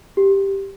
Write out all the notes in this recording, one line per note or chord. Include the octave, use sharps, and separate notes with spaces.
G4